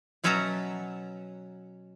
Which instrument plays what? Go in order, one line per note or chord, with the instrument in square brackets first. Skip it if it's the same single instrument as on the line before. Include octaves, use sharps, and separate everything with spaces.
[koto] B2 F#3 C#4 E5 A5 A#5